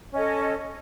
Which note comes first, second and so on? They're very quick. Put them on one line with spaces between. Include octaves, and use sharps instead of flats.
C#4 D#5 A4